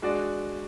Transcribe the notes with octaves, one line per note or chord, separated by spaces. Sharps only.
G#3 D4 F#4 D5